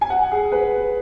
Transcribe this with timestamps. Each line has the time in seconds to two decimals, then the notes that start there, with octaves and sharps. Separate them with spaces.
0.01 G#5
0.10 F#5
0.31 G#4
0.52 B4